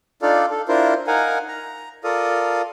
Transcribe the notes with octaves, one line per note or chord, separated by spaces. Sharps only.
D4 D#4 F4 A4 D5 F5
A4
D4 E4 F4 A#4 C5
D#4 A#4 F5 F#5 G#5
A#5
F4 A4 A#4 D5 F5 D#6